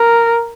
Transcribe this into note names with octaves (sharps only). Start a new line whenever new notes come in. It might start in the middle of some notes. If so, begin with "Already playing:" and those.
Already playing: A#4